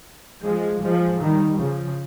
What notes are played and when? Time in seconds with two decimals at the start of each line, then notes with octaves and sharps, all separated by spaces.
0.43 F3 G#3
0.82 F3 G#3
1.21 D#3 G3
1.59 C#3 F3